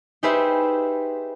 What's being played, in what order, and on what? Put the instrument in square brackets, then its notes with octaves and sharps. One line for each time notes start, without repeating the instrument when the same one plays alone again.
[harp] D#4 G4 G#4 B4 C5 E5